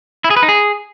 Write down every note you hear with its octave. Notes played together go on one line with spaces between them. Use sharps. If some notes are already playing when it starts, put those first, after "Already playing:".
E4
G#4
B4
D#4
G#4